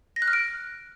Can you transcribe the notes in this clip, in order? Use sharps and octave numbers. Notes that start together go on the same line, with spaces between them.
A#6
F#6
F6
D7